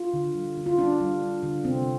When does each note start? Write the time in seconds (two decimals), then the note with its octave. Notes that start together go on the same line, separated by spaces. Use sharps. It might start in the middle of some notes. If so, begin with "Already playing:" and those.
Already playing: F4
0.14 D3
0.35 G3
0.57 D3
0.66 F4
0.77 G3 D4
1.00 G3
1.22 G3
1.43 D3
1.65 C3 C4